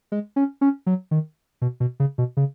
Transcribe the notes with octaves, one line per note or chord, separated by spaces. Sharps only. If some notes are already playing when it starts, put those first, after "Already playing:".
G#3
C#4
C#4
F#3
D#3
B2
B2
C#3
B2
C#3